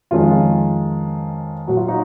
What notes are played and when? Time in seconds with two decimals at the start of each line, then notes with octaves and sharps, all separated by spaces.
0.11 F2 D#3 G#3 C#4 F4
1.67 A#2 F#3 F#4
1.77 F4
1.88 D#4 F#4